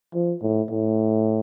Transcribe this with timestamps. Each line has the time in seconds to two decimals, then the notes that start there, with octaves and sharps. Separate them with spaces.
0.14 F3
0.42 A2
0.71 A2